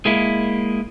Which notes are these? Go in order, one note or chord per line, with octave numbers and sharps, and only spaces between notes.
G#3 A#3 E4